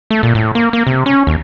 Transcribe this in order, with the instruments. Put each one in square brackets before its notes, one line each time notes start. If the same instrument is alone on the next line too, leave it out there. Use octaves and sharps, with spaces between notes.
[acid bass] A3
A#2
A2
A#3
A#3
C3
C#4
D#2